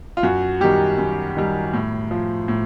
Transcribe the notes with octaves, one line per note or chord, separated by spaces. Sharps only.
F4
F#2 F#4
D#3 G3 G4
F#2
D#3 G3
A2
F3
A2